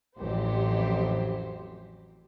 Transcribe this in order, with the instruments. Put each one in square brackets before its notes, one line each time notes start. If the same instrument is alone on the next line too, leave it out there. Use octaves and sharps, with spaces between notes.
[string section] A1 F2 E3 F#3 G4 C5